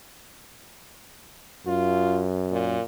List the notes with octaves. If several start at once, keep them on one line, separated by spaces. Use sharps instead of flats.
F#2 F4
A#2